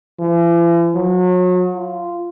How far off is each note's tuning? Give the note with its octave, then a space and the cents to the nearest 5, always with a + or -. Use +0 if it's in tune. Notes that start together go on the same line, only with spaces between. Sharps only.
E3 +45
F#3 -35
F4 -10